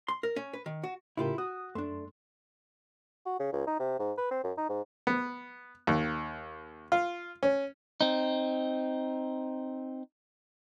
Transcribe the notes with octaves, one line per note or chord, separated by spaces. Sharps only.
C6
A#4
C#4
B4
D#3
F#4
A2 C#3 E4 F4 G4 A#4
F#4 D#6
F#2 A3 D4 C6
F#4
C#3
C#2
D#4
C3
G#2
B4
C4
F#2
D#4
G#2
B3
D#2
F4
C#4
C4 D#4